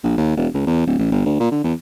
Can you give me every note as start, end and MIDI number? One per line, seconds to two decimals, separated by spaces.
0.04 0.16 34
0.18 0.35 39
0.37 0.47 28
0.54 0.66 37
0.67 0.82 40
0.87 0.97 26
0.99 1.07 33
1.12 1.23 31
1.26 1.36 38
1.40 1.48 46
1.51 1.60 50
1.64 1.73 40